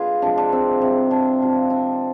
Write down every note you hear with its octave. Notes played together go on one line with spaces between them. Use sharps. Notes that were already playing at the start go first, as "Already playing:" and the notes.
Already playing: D3 G#3 F4 G#4 B4
C3 F3 G#3 D4
D4
C4
C3 G3
D4
C3 F3 G#3
D4